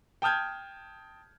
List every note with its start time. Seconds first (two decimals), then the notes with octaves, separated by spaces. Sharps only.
0.22 G5 A5 D#6 F6 G6 G#6